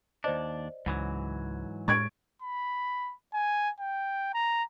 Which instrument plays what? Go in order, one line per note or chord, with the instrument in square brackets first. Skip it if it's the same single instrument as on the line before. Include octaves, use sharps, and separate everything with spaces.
[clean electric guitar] D#2 D4 [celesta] C5 D5 D#5
[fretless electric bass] C#2 [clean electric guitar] G#2 E3 F#3
[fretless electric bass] A2 G#3 [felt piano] C#6 G#6 D7 [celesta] A6
[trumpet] B5
G#5
G5
A#5